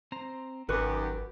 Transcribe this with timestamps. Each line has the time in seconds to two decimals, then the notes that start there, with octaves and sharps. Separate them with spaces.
0.12 C4 C5 A#5
0.69 G#1 F#2 D#3 F#4 G4 B4 C#6 D#6